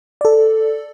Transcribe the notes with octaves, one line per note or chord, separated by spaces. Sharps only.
A4 D5